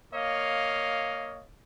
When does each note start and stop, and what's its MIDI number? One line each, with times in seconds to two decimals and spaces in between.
0.13 1.45 58
0.13 1.45 73
0.13 1.45 75
0.13 1.45 77